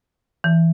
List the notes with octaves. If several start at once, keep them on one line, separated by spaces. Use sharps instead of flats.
E3